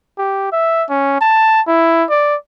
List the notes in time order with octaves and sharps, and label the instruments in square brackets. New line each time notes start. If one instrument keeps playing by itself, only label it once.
[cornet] G4
E5
C#4
A5
E4
D5